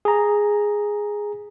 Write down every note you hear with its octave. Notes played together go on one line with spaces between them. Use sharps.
G#4 A#5